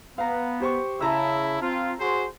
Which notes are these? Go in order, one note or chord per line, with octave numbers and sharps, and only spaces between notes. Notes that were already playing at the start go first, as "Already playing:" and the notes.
B3 F5 A#5
G4 C5 C#6
C#3 E4 A5 A#5 E6
C4 F4
F#4 G#4 C5